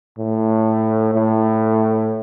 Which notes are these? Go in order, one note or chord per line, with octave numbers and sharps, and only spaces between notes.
A2
A2